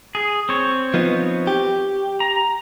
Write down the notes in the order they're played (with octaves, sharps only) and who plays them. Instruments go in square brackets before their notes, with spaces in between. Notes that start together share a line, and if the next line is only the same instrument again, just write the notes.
[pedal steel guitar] G#4
C4 C#5
[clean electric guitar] F3 B3 D#4
G4
[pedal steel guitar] A#5